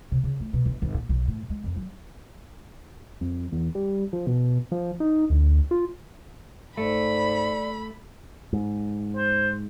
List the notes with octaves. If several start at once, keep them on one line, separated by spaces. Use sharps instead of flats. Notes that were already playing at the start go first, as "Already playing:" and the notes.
C3
C#3
A3
B2
G1
G#1
A#2
B1
A2
G#3
F2
F#3
F2
E2
G3
F3
B2
F3
D#4
D2
F4
G#2 A3 D5 B5
G#2
C5